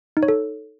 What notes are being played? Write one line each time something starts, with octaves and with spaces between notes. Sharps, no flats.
D#4
C#5
A4